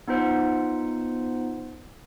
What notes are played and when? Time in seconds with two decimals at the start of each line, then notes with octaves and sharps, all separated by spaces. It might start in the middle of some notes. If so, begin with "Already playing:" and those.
0.08 B3 D#4 F4 C5 F#5